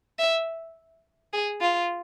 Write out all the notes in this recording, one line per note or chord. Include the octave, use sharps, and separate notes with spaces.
E5
G#4
F4